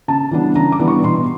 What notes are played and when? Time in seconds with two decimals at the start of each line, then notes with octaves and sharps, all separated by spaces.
0.08 C#3 A5
0.31 E3 G3 B3 D4
0.55 C#3 A#5
0.72 D6
0.79 E3 G3 B3 D4
0.88 C#6
1.03 B2 C6